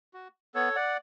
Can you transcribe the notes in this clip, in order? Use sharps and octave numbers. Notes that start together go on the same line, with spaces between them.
F#4
B3 A4 C#5
D5 F#5